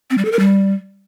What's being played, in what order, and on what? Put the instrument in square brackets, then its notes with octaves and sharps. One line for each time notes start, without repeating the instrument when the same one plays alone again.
[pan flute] C4
G3
A4
A#4
G3